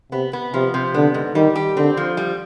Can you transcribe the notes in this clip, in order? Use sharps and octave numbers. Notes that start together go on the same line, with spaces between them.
C3 B3
B3
C3 F3
C3
D3 B3
G#2
D#3 G3
G4
D3 C4
F3
G3